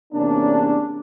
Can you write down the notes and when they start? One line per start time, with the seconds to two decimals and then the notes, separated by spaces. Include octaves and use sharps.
0.13 E2 C3 A#3 C#4 D4